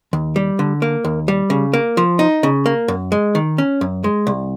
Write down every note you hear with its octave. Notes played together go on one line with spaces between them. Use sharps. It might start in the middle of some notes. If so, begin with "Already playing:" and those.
D#2
G3
D3
A#3
D#2
G3
C#3
A#3
F3
D#4
C#3
A#3
F#2
G#3
D#3
C#4
F#2
G#3
C2